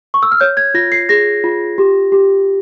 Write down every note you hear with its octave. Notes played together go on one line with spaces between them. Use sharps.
C#6
E6
F6
C#5 G6
G#6
F4 A#6
C7
G#4 A#6
F4
G4
G4